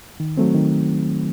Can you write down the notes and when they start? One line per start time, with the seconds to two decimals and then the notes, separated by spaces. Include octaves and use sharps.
0.20 D#3
0.37 F#3 A3 C4
0.55 D#3